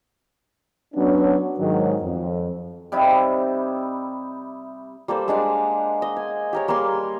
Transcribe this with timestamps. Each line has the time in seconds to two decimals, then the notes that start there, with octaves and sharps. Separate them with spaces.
0.94 F#3 B3 C#4 D4
1.59 G#2 D#3 F#3
2.03 F2
2.92 C3 G3 D#4 E4
5.08 G3 A#3 A4 C5
5.28 G#3 D4 F5 F#5
6.02 D#5
6.17 G#5
6.53 G4 A#4 C#5
6.68 G3 A#3 G#4 C6